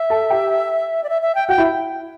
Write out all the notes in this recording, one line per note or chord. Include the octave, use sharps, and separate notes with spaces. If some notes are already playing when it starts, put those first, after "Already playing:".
Already playing: E5
A4 A5
G4 G5
D5
E5
E5
G5
F#4 F#5 G5
E4 E5